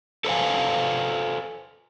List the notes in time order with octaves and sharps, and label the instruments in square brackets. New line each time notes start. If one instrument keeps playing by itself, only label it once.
[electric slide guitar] A4 B4 C5 E5 F5 G#5